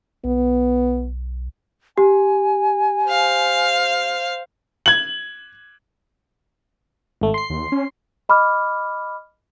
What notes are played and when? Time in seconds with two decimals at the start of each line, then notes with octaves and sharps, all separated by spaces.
0.24 B1 B3
1.98 G4 G#5
3.06 C5 F5
4.86 G#6 F#7
7.21 G#1 A3
7.34 C6 C7
7.50 D#2
7.72 C#4
8.29 D#5 B5 D6 F6